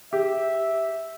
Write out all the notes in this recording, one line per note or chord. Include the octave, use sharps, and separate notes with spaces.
G4 E5